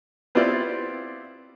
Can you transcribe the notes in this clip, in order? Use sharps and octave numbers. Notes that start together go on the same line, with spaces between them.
B3 C4 E4 F4 G4 D5